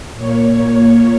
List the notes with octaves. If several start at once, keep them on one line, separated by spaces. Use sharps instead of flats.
A#2 A#3 C#5